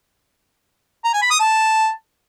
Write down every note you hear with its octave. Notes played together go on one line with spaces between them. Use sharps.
A#5
G#5
B5
D#6
A5